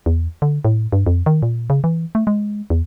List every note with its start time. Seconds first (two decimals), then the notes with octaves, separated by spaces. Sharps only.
0.06 E2
0.42 D3
0.65 A2
0.92 G2
1.06 F2
1.26 D#3
1.43 A#2
1.70 C#3
1.84 E3
2.15 A3
2.27 G#3
2.70 E2